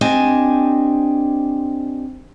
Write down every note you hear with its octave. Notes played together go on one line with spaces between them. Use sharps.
C4 D4 G4 D#5 G#5